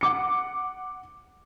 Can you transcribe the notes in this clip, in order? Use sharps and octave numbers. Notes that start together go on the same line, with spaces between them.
F#5 D6 C#7